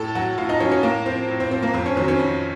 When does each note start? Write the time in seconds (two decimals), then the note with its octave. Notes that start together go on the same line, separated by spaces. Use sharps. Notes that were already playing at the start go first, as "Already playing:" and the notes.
Already playing: A2 A4
0.15 F#3 F#4
0.38 A2 F4
0.49 D#4
0.60 F#3 C#4
0.72 C#4
0.83 A2 A#3
1.06 F3 C4
1.28 A2
1.40 C4
1.51 F3 C4
1.62 A#3
1.74 F2 C4
1.86 C#4
1.97 D#3 F#3 C4
2.08 C#4
2.19 F2